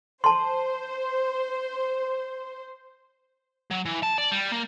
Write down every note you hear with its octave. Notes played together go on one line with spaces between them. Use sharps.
C5 A5 C6
F#3
E3
A5
D5
G3
A#3